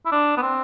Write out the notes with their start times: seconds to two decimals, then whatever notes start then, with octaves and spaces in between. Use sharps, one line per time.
0.06 E4
0.12 D4
0.37 B3
0.42 C4